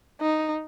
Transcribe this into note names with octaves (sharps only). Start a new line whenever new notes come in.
D#4